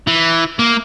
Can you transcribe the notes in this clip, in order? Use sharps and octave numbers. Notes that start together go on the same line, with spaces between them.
E3
A#3